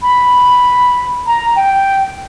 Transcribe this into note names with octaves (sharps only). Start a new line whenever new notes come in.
B5
A#5
G5